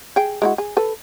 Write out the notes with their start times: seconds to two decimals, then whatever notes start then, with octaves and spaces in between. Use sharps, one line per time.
0.16 G#4 G5
0.42 G#3 E4 F#4
0.58 G#4
0.77 A4 B4